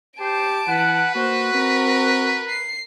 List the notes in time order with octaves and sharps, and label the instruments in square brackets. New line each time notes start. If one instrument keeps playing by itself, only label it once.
[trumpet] G4 [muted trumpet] C5 [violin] A5 D7
[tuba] E3 [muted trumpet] B4 [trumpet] F#5
[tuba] A#3 [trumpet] F#4 [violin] C5
[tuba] C4 [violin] A#4
[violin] C7